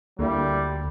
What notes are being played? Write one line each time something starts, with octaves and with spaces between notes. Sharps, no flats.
D2 D3 G3 A#3 E4